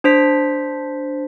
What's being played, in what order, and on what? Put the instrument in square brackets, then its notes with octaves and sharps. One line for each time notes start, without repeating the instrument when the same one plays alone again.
[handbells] D4 C5 B6